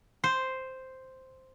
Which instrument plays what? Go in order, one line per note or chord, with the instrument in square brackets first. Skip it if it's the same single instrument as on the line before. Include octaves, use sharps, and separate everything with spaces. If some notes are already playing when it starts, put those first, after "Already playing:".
[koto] C5